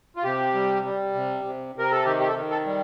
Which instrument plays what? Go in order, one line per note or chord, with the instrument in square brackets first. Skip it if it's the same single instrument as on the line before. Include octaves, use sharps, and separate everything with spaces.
[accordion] F4
C3 G4
G3
G3
C3
C3
C3 A#4
A4
D#3 G4
G4
A4
D#3
A4
G3